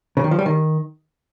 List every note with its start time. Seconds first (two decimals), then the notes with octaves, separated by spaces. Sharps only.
0.17 C#3
0.24 D#3
0.31 F3
0.39 G3
0.46 D#3